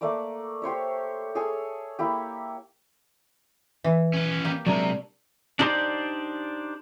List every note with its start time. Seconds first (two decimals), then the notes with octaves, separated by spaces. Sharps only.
0.01 A3 A#3 D5 D6
0.62 G4 C5 C#5 E5
1.35 G#4 A4 C#5 G#5
1.99 A#3 E4 G4
3.84 E3
4.13 C#4 B4
4.45 A#3 G4
4.67 C3 F#3 G#3 D4 A#4
5.59 D4 D#4 G4 A4 C5 D5